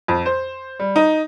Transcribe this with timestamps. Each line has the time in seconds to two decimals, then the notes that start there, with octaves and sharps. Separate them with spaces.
0.08 F2
0.26 C5
0.79 G3
0.96 D#4